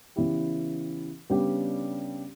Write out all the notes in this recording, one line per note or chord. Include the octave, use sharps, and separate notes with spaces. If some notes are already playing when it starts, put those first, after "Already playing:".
C#3 E3 B3 E4 G4
C#3 G3 B3 D4 G4